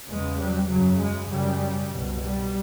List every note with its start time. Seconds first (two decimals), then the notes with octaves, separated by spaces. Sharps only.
0.09 E2 C#3 G#3
0.39 G3
0.69 F#2 C#3 F#3
0.99 G#3
1.29 F#2 C#3 G3
1.90 C2 B2
2.20 G3